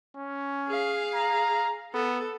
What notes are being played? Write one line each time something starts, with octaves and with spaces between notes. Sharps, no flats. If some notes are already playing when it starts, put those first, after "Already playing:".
C#4
G#4 F5
A#5
B3 A4